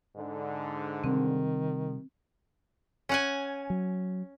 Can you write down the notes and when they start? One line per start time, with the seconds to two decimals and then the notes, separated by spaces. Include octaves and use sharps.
0.16 G#2 D3
1.04 C3 D#3 G3 C4
3.09 C#4 F#5 G#5
3.70 F#3